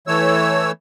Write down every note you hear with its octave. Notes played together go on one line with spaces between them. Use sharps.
E3 A3 C#5 E6